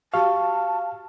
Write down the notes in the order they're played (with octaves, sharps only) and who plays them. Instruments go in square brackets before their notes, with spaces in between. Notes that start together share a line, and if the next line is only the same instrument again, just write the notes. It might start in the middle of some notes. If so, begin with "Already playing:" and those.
[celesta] F#4 G4 C#6 [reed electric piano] F5 [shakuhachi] A5